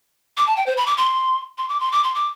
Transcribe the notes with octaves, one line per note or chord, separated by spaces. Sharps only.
D6
A5
G5
C5
B5
D6
C6
C6
D6
C6
D6
C6
D6